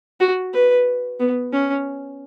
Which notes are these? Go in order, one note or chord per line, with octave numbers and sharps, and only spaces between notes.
F#4
B4
B3
C#4